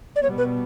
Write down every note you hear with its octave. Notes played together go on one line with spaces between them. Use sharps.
D5
B2 G3 B3 C#5
B4